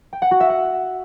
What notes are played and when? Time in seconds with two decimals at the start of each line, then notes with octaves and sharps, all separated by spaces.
0.13 G5
0.22 F#5
0.31 F#4
0.40 E5
0.50 F#5